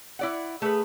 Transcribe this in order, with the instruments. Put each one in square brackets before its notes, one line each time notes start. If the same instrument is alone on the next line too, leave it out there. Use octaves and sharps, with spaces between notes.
[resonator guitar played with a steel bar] E4 D5 F#5
[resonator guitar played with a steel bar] A3 B4 [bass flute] G#4